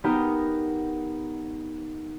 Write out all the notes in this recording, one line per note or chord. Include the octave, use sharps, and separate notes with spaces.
B3 D#4 G4 A#4